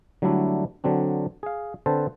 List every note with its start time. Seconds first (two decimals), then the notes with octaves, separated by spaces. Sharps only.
0.22 D3 F#3 G3 A3 D4 E4
0.84 D3 F#3 C4 D4
1.43 G#4 F5
1.86 D3 C4 A4 B4 C5 A5